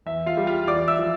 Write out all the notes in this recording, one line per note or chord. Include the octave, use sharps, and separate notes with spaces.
E2 E5
F4 F5
G3
F4 F5
E2 D5 D6
E5 E6
F3